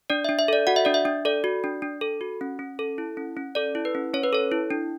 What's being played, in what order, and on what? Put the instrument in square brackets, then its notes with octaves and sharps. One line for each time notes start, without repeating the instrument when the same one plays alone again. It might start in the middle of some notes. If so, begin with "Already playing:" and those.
[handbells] D4 D5
E5
D4
E5
A4 D5
F#4 F#5
E5
D4 D5
E5
D4
A4 D5
F#4
D4
D4
A4
F#4
C#4
C#4
A4
E4
C#4
C#4
A4 D5
E4
B4
C#4
C#4 C#5
B4
A4 C#5
E4
D4